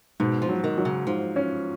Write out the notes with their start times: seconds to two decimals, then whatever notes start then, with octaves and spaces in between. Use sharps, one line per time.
0.20 G#2 B2
0.42 F3
0.49 F#3
0.64 D#3
0.78 F#3
0.85 C#3
1.06 G#2 F3
1.36 C#4